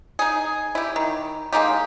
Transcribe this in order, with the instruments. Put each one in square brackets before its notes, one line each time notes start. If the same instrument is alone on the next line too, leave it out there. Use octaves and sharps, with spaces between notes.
[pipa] D#4 G#4
E4 G4
D#3
G#3 A#3 D#4 G4